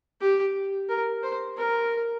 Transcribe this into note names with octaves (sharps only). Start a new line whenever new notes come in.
G4
A#4
C5
A#4